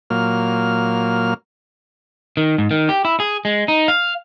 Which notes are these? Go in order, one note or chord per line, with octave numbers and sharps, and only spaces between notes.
A#2 F#3 A#3 F6
D#3
G#2
D#3
G4
E4
G#4
G#3
D#4
F5